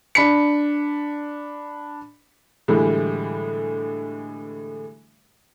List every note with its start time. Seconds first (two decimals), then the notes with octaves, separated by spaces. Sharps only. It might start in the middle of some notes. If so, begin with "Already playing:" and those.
0.15 D4 B5 B6 C#7
2.68 A2 D3 E3 G3 G#3